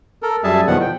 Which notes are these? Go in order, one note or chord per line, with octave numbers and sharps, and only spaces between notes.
A4 A#4
F#2 G3 G#4 E5 A5
E2 B2 D#3 F3 G3 F#5
G5